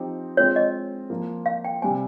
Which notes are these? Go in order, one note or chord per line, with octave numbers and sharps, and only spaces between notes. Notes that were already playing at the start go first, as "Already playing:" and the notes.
Already playing: F3 C4 D#4 G4
G#3 C4 F4 C#5
D#5
F3 A#3 F4
F5
G5
C3 G3 C4 G#5